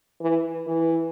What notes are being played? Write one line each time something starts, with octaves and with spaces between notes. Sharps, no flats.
E3
E3